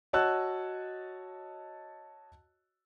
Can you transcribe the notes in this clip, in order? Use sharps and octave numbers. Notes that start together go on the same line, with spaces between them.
F#4 C#5 D#5 A5 E6 F#6